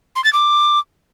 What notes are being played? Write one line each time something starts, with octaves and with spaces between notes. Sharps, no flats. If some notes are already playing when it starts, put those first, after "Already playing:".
C6
A6
D6